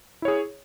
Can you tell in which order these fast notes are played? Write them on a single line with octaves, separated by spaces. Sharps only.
E4 C#5 G#4